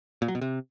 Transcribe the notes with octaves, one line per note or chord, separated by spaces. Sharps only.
A#2
F#3
B2
C3